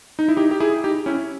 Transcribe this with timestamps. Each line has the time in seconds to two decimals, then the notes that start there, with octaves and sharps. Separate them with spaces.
0.19 D#4
0.28 E4
0.37 D#4 G4
0.51 G4
0.60 E4 G#4
0.84 D#4 G4
1.06 C#4 E4